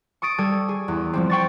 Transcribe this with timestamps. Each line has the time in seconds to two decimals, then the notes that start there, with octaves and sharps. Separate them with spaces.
0.22 C#6 D#6 A6 D7
0.38 G3 A4 G#6
0.69 G#4
0.88 E2
1.13 F3 G3 C4
1.30 G5 C#6 A6